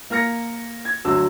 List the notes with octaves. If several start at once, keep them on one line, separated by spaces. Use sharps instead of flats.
A#3 A#4 F6 A#6 C#7
G#6
G1 D2 F#3 E6